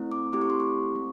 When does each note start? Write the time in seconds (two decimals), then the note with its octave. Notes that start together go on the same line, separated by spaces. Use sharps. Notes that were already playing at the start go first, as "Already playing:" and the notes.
Already playing: A3 C4 E4
0.12 D6
0.33 A3 C4 E4 G4 D6
0.41 C#6
0.50 C6
0.60 C#6
0.95 A3 C4